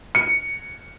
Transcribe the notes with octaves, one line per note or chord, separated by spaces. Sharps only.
C#7